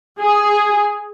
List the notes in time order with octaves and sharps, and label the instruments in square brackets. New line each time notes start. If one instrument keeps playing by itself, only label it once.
[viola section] G#4